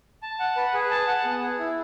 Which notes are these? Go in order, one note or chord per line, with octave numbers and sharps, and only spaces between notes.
A5
F#5
B4
G#4
A5
F#5
B3
G#4
E4